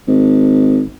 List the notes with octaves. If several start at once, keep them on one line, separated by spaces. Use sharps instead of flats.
G#1